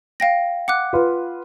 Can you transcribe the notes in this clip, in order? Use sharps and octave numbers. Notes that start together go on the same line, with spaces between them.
F5 G5 A#6
F#5 D6 F#6
F4 B4